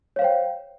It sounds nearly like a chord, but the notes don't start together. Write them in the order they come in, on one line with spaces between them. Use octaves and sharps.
C#5 F5 C5 G5